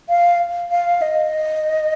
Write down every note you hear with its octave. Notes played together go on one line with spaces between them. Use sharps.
F5
F5
D#5